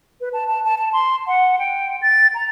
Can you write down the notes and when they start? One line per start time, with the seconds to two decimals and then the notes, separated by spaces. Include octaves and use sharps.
0.21 B4
0.33 A5
0.48 A5
0.65 A5
0.78 A5
0.93 C6
1.27 F#5
1.59 G5
2.02 A6
2.35 A#5